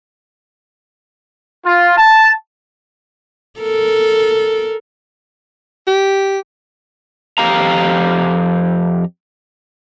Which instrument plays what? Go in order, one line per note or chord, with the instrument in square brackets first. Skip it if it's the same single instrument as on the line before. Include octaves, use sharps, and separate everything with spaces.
[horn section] F4
A5
[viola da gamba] A4 A#4
[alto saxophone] G4
[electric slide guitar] F2 G4 F5 A#5